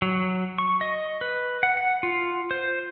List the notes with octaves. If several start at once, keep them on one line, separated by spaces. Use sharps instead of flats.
F#3
C#6
D#5
B4
F#5
F#5
F4
C5